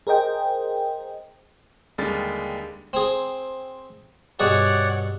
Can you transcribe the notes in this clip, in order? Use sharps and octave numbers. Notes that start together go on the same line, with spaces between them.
G#4 A#4 C5 D#5 G5
D#2 D3 G3 G#3 A6
C4 G#4
G2 B2 G#4 C#5 D5 F#5